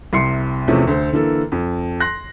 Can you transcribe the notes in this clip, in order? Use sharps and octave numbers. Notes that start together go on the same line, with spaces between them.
C2 C3 C6 C7 C#7
E2 C3 F3 A3 C#4
D2 A4 C5
D3 E3 A#3 A4
F2
C6 F#6 A#6